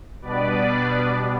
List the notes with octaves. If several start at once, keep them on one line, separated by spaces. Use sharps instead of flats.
B2 G3 B3 D4 B4 D5